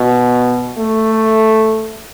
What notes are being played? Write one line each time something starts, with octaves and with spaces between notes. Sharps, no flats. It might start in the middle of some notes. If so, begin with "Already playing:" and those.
Already playing: B2
A3